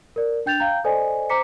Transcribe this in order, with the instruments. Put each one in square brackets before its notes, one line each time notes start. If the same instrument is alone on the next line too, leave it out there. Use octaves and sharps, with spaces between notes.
[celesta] A#4 D5
D4 G5 G6 A6 F7
F5 G5 A#5 G6
A4 C5 D5 D#5 G#5
C5 A#5 D6 B6 C#7